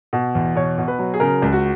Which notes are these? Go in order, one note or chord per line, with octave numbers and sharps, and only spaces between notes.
B2
E2
B2 C#5
B2
B4
F#3
G#4
C#3 A#4
C#2
F#4